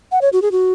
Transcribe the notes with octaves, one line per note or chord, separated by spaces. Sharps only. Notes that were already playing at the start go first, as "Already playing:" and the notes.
F#5
C#5
F#4
G#4
F#4